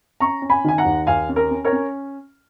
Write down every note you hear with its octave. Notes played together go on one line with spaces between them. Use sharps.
C#4 A#5 C#6
C#4
G#5 B5
D#3 G#5
F#5 A#5
D#2
D#2 F5 G#5
C#4
A#4
C#4
A#4 C#5
C#4